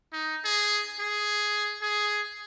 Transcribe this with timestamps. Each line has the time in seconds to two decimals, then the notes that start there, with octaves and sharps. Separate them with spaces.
0.13 D#4
0.45 G#4
1.00 G#4
1.81 G#4